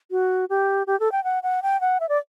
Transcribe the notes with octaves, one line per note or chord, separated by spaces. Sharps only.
F#4
G4
G4
A4
G5
F#5
F#5
G5
F#5
E5
D5